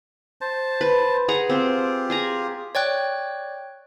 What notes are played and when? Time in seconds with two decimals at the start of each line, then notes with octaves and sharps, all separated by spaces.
0.41 C5 A5
0.81 B4
1.28 G#4 F#5 A#5
1.50 C4 F4 G4
2.10 G#4 G#5 A#5
2.75 C#5 D5 G5 F#6